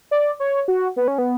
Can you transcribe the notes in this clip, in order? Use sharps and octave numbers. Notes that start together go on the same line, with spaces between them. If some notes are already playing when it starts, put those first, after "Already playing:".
D5
C#5
F#4
B3
C#4
B3